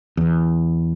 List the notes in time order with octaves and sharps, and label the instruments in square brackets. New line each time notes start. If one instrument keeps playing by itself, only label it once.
[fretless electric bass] E2